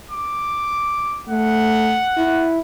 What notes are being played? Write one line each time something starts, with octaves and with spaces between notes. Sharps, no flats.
D6
A3 F#5
E4